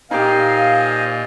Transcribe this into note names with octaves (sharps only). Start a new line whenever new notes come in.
A#2 D#4 G4 C5 D#5 F5 G#5